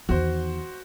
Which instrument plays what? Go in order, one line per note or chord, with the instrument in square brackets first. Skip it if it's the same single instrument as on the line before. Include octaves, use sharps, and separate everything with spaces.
[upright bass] E2 D#3 [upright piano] F#4 C5